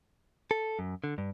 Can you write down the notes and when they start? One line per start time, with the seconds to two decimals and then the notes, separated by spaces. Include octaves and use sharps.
0.51 A4
0.79 F#2
1.04 D3
1.18 G2